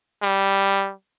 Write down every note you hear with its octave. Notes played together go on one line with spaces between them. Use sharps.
G3